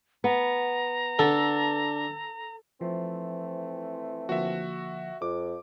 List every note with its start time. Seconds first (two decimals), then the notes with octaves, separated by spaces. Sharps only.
0.24 B3 A#5
1.19 D3 A4
2.81 E3 F3 A3 C4
4.29 D3 F3 A#3 F#4 E5
5.22 F2 D6